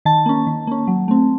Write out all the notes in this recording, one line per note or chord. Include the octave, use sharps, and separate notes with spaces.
D#3 A5
A#3 C#4
D#3
A#3 C#4
F#3
A3 C4